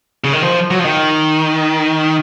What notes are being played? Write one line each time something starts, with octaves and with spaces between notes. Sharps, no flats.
C#3
D#3
F3
F#3
F3
D#3